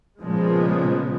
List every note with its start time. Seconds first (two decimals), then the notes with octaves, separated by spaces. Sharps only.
0.19 A#2 C#3 F3 G#3 B3